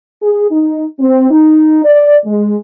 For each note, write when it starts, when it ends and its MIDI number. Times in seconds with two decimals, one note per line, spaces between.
0.22 0.46 68
0.51 0.84 63
1.00 1.28 60
1.30 1.80 63
1.84 2.16 74
2.26 2.57 56